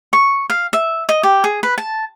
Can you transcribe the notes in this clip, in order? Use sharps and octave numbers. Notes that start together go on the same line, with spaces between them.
C#6
F5
E5
D#5
G4
G#4
B4
A5